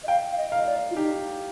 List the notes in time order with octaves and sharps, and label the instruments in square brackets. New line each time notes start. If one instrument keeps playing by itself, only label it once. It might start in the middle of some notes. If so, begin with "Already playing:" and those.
[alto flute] D#5
[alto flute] F5 [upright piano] G5
[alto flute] F5
D#5
[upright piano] F5
[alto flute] D#5
D5
F4
[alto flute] D#4 [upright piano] G4